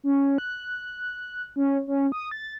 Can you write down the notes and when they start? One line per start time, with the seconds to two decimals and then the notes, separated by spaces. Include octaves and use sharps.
0.04 C#4
0.38 F#6
1.56 C#4
1.87 C#4
2.12 D#6
2.31 A6